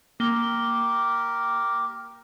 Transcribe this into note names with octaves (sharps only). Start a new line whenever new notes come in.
A#3 G4 A#4 G7